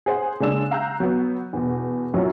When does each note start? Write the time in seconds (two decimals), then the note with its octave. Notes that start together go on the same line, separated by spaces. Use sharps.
0.06 G#4 C5 F#5
0.40 C#3 G#3 A#3 D4 E6 E7
0.71 F5 A#5 E6 F#6 G6
1.00 F#3 B3
1.53 E2 B2
2.14 F#2 A2 F3 F#3 C#4